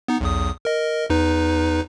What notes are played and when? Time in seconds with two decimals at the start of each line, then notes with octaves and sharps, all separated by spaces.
0.08 B3 D#4
0.21 B1 E2 D#6
0.65 A#4 D#5
1.10 E2 D#4 B4